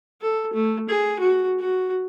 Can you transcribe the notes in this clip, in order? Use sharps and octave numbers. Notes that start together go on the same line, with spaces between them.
A4
A3
G#4
F#4
F#4